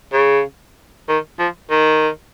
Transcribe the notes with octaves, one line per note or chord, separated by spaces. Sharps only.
C#3
D#3
F3
D#3